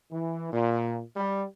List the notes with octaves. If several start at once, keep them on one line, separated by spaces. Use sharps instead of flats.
E3
A#2
G3